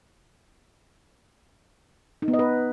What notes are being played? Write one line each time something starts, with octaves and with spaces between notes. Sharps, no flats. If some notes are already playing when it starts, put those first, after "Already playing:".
D#4
B3
D#5
B4